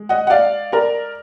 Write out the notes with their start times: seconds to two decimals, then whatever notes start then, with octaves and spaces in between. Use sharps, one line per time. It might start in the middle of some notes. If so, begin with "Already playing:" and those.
Already playing: G#3
0.09 D#5 F#5
0.27 F#5
0.30 D5 F5
0.72 A#4 D5